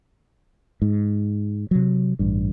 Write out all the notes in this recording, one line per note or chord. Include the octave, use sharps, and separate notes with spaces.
G#2
C3 F#3
A1 G2